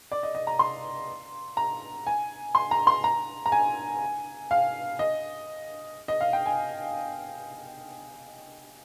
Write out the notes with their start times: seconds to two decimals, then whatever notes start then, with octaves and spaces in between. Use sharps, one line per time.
0.12 D5
0.23 D#5
0.35 D#5
0.47 A#5
0.59 C6
1.57 A#5
2.07 G#5
2.55 C6
2.71 A#5
2.87 C6
3.04 A#5
3.46 A#5
3.52 G#5
4.51 F5
4.99 D#5
6.08 D#5
6.21 F5
6.33 G5
6.46 G#5